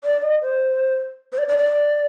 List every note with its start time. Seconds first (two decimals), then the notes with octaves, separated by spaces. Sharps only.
0.04 D5
0.22 D#5
0.42 C5
1.33 C5
1.38 D5
1.48 D5
1.59 D5